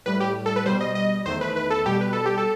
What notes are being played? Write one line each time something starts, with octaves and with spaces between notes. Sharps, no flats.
A2 G3 B4
G4
A4
B4
B2 G3 C5
D#5
D#5
E2 D#3 A3 C5
B4
B4
A4
B2 G3 G4
B4
A4
G4
A4